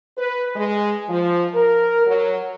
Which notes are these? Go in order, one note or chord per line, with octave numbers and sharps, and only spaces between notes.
B4
G#3
F3
A#4
F#3